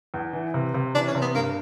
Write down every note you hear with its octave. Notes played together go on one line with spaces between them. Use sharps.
E2
E3
C3
C3
E3 D4
C#4
C3
B3
G2 A#3